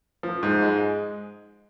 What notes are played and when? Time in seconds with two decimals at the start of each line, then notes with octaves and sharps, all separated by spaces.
0.23 F3
0.43 G#2
0.62 G#3